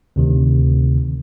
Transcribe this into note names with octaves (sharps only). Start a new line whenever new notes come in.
D2 C3 D#3